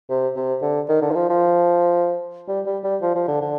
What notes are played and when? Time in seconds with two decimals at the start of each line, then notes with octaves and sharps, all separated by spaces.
0.10 C3
0.36 C3
0.62 D3
0.89 D#3
1.02 D3
1.11 D#3
1.15 F3
1.29 F3
2.48 G3
2.66 G3
2.84 G3
3.02 F3
3.15 F3
3.28 D3
3.41 D3